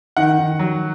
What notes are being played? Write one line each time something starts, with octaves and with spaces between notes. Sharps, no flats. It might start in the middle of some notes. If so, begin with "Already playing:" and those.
D#3 F#5
D#3
F#3